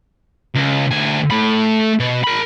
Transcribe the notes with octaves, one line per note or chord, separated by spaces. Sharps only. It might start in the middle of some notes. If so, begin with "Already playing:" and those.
C#2
D2 G#5
A3 B5
B2
A#4 B5